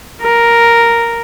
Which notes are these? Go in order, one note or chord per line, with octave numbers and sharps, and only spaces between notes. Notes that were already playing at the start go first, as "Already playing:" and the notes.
A#4